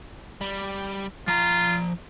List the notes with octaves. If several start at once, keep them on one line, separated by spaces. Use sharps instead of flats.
G3
F3 F4 A#5